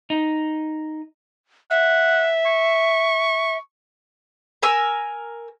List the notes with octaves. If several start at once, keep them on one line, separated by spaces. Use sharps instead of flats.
D#4
E5 F#5
C#6
A#4 G#5 E6